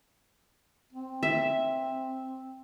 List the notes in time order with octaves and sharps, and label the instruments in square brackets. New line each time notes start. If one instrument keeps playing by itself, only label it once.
[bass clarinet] C4
[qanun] E5